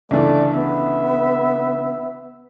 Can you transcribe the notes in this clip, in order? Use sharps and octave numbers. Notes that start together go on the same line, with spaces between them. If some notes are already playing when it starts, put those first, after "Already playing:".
C#2 D3 E3 A3 D5
B3 E5